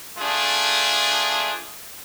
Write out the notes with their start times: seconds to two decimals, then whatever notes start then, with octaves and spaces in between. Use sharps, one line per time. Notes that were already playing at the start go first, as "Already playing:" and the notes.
0.19 A3 D4 F4 G#4